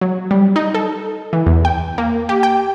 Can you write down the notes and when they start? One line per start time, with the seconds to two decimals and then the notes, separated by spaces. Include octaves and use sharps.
0.01 F#3
0.31 G3
0.56 D#4
0.74 A4
1.33 E3
1.46 E2
1.65 G5
1.98 A#3
2.29 G4
2.43 G5